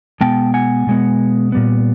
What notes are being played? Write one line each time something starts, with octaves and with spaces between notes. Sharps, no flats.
B2 G#3 B3 G5 A5
F#5 G#5
B2 G#3 B3
A#2 G3 B3